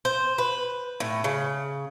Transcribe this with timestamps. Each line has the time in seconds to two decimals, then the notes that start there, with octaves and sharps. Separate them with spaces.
0.05 C5
0.38 B4
1.00 A2
1.24 C#3